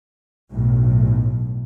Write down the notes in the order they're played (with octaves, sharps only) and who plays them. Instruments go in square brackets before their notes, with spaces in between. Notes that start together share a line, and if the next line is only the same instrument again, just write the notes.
[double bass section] B1 A2